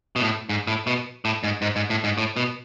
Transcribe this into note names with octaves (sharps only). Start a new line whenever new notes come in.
B2
A2
G#2
A2
B2
A2
G#2
G#2
G#2
A2
G#2
A2
B2